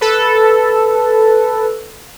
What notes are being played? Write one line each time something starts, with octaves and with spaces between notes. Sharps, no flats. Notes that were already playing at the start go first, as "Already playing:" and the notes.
A4 B4